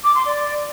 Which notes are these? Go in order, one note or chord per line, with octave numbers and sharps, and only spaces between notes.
D6
C6
D5